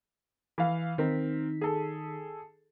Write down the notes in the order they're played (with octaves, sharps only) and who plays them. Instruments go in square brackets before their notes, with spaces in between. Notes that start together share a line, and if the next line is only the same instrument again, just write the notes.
[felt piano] E3 F5
[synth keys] D#3 D#4 B6 [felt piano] C4 A#4
[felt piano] G#4 A4